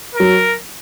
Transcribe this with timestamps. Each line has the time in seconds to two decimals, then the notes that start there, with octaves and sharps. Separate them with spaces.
0.15 A#4
0.20 F#3